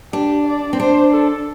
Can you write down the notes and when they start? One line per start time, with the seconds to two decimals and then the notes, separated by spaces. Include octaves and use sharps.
0.13 D4 G4
0.46 D5
0.73 C4
0.80 D4 C5
1.13 A4